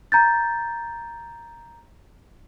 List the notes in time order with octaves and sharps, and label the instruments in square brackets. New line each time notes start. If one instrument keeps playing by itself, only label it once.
[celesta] A#5 G6 A6